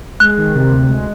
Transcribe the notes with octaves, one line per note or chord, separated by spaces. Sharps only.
G#3 F#6
D#3
C3
D2
G#3